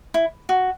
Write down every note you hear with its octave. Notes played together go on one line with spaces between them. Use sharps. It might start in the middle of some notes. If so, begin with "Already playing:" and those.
E4
F#4